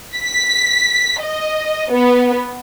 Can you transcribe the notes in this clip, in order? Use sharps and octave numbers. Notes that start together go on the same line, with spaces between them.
B6
D#5
B3